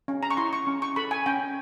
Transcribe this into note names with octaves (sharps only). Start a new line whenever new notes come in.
C#4
A#5
C#6
E4 C6
C#6
C#4
C#6
A4 B5
G#5
C#4 G5